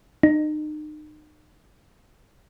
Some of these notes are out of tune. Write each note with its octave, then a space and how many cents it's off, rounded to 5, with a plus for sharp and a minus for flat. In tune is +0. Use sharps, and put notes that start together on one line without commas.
D#4 -35